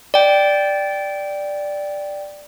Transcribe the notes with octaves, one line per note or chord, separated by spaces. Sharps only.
D5 G5